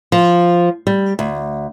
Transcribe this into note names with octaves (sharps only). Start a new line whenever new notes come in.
F3
G3
D2